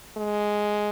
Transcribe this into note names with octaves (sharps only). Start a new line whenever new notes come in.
G#3